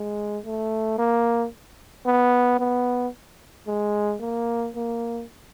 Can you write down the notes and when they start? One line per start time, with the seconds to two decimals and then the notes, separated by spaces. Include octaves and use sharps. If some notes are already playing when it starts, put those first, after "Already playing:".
Already playing: G#3
0.45 A3
0.98 A#3
2.06 B3
2.59 B3
3.67 G#3
4.21 A#3
4.75 A#3